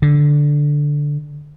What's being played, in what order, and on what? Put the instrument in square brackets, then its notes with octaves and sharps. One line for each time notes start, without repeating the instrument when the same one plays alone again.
[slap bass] D3